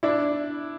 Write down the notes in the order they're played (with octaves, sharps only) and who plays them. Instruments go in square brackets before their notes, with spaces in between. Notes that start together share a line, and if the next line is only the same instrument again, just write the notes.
[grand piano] D4 E4